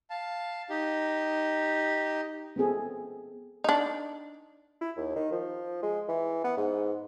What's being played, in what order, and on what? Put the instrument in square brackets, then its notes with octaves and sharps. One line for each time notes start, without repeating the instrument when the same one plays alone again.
[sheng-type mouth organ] F5 A5
D#4 G4
[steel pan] B3 C4 G#4 A4
[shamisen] D4 D#4
[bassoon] E4
D#2
D#3
F3
G#3
E3
B3
G#2